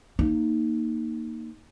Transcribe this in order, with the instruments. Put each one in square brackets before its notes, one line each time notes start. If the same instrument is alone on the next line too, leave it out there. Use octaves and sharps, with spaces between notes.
[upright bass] A#3 D#4